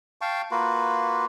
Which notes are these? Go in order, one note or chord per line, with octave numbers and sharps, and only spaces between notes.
F5 G5 A5 C#6
A#3 F4 F#4 B4